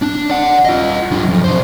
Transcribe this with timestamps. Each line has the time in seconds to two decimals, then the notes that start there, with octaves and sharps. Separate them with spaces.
0.02 D4
0.29 D5 F#5
0.65 F4 D#5
1.12 F#3 D4
1.29 F2
1.44 B1 C5